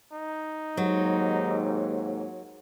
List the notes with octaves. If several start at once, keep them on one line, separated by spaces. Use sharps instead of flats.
D#4
D#2 G#2 F#3